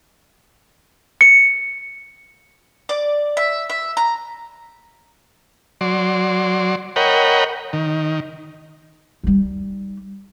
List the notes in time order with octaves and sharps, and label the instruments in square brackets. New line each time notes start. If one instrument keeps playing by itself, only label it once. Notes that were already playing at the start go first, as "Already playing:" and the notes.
[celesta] C#7
[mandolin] D5
E5
E5
A#5
[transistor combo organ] F#3 D5 C6
A#4 C#5 D#5 F#5 G5 B5
D#3
[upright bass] G3 D#4